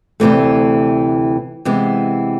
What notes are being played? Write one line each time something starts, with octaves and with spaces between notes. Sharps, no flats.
D2 C3 E3 A3
C3 E3 G#3 B3